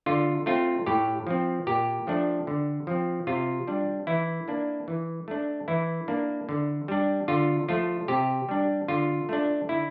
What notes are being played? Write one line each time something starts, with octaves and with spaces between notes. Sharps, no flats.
D3 F4
A3 C4 F4
A2 G4
F3 C4
A#2 G4
F3 A3 D4
D3
F3 C4
C3 F4
G3 D4
E3 E4
A#3 D4
E3
A3 D4
E3 E4
A#3 D4
D3
G3 D4
D3 F4
F3 A3 F4
C3 G4
G3 D4
D3 F4
A3 D4
D3 E4